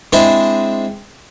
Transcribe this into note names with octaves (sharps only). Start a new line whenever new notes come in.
G#3 C4 D4 E4 C5